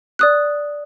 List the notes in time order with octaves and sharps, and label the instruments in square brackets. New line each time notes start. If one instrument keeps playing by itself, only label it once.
[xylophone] D5 D#6 F#6